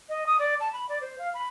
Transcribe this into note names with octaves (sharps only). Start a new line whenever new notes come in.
D#5
D#6
D5
A5
B5
D5
C5
F5
B5